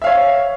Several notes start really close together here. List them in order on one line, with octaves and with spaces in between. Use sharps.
E5 F5 C#5